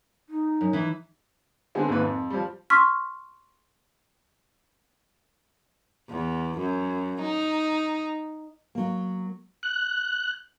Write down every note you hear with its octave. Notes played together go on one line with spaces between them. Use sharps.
D#4
F#2
E3 E4
D3 G#3 B3 C4
G#1 D#2 G#2 B4
F2
F3 G3
C6 C#6 E6 F6 B6
E2
F#2
D#4
F#3 A#3
F#6